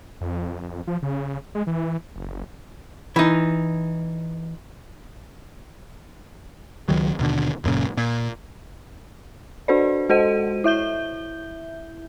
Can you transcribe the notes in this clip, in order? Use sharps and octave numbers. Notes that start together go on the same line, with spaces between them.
F2
F3
C#3
G#3
E3
F#1
E3 D#4
C#2 D#3 F#3
D#2 B2 D3
D#1 F#2 A#2 C#3
A#2
D4 F#4 A4 C5 D5
G#3 F#4 A4 C5 D#5 D#7
E4 E5 G6 G7